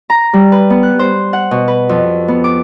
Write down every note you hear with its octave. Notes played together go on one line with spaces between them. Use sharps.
A#5
G3
B4
B3
F#6
C5
F#5
B2
B4
F2
B3
D6